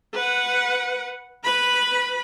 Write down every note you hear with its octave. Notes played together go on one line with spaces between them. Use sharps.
B4 F#5
B4 B5